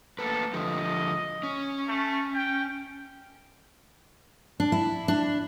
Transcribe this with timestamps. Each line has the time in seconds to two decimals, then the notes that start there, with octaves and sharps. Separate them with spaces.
0.19 A3 A#3 A4 B4
0.53 D3 F3 A3 D#5
1.43 C#4
1.88 A3
2.34 G5
4.60 D4
4.72 E4
5.08 D4